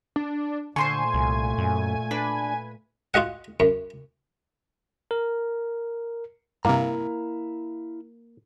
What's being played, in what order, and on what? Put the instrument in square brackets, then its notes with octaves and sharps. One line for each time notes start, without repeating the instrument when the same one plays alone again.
[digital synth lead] D4
[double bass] A#2 A3 [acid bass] D3 [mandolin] C5 C6 C#6 [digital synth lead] G#5
[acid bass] C2
F#2
[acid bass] D4 [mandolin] B4
[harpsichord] F4 F#4 D#5 F#5
F#2
[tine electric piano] A#4
[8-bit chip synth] G2 C3 [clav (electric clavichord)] A#3 [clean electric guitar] E4 F5 A#5